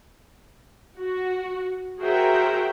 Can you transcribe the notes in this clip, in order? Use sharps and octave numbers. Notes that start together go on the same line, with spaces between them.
F#4
F#4 G#4 A#4 C5 E5 G5